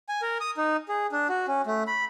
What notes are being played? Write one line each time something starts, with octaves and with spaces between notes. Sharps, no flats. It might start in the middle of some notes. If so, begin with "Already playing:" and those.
G#5
A#4
D#6
D#4
G#4
D4
F#4
C#4
A3
B5